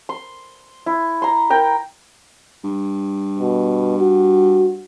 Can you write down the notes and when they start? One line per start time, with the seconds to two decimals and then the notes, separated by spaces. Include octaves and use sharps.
0.09 C6
0.86 E4
1.22 A#5 C6
1.50 A#4 G5 A#5
2.64 G2
3.39 B2
3.97 F#4